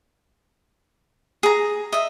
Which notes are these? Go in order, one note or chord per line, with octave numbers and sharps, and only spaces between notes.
G#4 A#5
D#5 E5